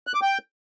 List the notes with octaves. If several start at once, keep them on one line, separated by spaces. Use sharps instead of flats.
F#6
D6
G5